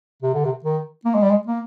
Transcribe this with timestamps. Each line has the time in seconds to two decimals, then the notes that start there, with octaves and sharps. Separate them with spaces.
0.22 C3
0.34 D3
0.45 C3
0.64 D#3
1.05 A#3
1.14 G#3
1.22 G3
1.31 G#3
1.47 A#3